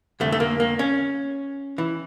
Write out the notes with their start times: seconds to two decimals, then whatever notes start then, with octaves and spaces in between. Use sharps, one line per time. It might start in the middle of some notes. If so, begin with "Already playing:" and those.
0.20 F2 D3 A3
0.32 A3
0.40 A#3
0.60 A#3
0.79 C#4
1.78 E3